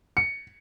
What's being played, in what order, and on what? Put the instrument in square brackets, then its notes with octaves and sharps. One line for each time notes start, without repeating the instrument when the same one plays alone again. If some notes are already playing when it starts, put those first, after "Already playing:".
[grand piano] C#7